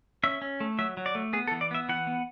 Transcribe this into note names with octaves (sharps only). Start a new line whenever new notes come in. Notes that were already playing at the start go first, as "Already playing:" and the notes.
C#4 E5
C#4
A3
F#3 E5
F#3
D5
A3
B3 G#4
A4
E3
D5
B3 E5
E3 F#5
B3